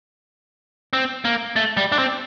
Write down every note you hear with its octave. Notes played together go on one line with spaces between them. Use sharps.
C4
A#3
A3
G3
D4
C4